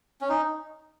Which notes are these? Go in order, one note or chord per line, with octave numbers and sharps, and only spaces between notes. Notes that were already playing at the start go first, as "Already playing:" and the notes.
C#4
D#4